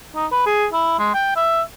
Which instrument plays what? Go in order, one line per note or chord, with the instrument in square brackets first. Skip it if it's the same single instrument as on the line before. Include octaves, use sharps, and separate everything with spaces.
[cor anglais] D#4
B4
G#4
E4
G#3
G5
E5